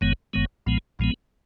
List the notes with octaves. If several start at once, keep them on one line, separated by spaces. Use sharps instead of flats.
F#1 F#2 D#3 G#3 B3
F#1 F#2 D#3 G#3 B3
B1 A#2 F3 G#3 B3
B1 A#2 F3 G#3 B3